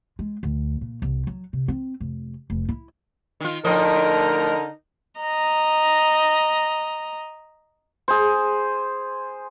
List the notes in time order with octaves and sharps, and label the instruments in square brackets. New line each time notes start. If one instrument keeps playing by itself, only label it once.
[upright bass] G#3
D2
A#2
C2
F#3
C3
C4
F1
F1
E4
[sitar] D#3 F4
[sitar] A2 F3 D#5 [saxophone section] D3 D#4 A#4
[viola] D#5 A#5
[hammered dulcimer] G#4 C5